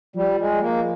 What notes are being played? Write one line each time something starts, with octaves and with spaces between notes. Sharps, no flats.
F3 G3
G#3
A#3